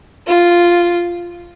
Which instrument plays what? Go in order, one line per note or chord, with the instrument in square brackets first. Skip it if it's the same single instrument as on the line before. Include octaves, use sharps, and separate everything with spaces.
[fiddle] F4